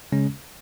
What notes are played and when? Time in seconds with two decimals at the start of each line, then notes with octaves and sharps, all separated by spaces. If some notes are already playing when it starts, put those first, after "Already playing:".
0.12 C#3 G#3 C#4